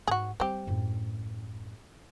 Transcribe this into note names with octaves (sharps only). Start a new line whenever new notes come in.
G#2 F#4 G#4
G3 C4 G4
F#2 A2